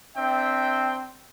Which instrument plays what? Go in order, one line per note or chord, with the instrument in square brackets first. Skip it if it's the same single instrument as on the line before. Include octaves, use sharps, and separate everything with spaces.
[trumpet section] C4 D4 E5 G5